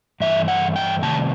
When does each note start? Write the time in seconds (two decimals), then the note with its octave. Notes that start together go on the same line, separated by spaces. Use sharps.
0.20 G2 E3 A3 E5
0.48 F#5
0.76 G5
1.03 C3 D#3 A3 A5